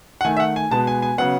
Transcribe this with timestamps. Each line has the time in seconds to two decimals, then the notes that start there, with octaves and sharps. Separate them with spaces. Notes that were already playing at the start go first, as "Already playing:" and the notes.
0.21 F#5
0.25 D#3 A3 G#5
0.37 E5
0.40 F#5
0.56 G#5
0.71 B2 G#3 B3 A5
0.87 G#5
1.02 G#5
1.18 C#3 F#3 B3 F#5